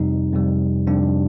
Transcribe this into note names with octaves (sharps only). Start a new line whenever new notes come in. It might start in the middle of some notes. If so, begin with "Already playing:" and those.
Already playing: F2 C3 G3 D#4
F2 C3 G3
F2 C3 G3 D4